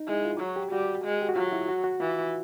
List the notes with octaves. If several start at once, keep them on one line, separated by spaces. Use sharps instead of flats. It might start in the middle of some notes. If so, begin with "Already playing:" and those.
Already playing: D#4
G#3 E4
F4
F#3 F#4
G4
G3 F#4
G#3
G4
F#4
F#3 F4
E4
F#4
F#4
E3 F4